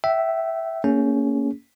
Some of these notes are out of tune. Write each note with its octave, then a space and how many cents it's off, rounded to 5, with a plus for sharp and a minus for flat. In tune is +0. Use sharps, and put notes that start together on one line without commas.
E5 +0 G5 -30
A#3 -15 C#4 +15 G#4 +0